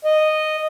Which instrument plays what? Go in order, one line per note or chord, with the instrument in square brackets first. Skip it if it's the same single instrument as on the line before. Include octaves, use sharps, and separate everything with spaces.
[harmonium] D#5